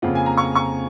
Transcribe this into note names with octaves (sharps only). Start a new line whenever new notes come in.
F2 C#3 F3 A#3 F4 F#5
G#5
A#5
C#6
C#6